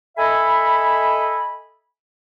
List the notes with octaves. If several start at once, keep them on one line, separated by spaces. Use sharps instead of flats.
A4 D#5 E5 G#5 B5